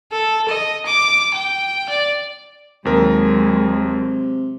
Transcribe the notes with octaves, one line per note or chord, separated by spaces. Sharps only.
A4
D#5
D6
G5
D5
D#2 C3 F#3 G#3 A#4